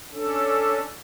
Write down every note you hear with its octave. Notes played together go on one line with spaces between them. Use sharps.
C#4 D4 A4